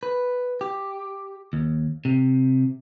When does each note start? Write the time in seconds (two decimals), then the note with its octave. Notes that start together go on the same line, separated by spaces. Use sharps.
0.03 B4
0.61 G4
1.53 D#2
2.05 C3